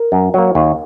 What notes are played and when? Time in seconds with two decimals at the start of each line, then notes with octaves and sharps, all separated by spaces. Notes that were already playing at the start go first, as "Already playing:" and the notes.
Already playing: A#4
0.12 F#2
0.34 F#3 A#3
0.55 D#2